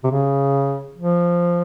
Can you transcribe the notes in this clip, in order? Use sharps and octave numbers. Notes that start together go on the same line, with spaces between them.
C3
C#3
F3